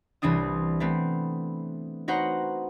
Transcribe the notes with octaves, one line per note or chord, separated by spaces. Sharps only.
C2 E3 C4 D4 D#6
A3 B3 C4
D#4 F#4 B4 C5 F#5 A#5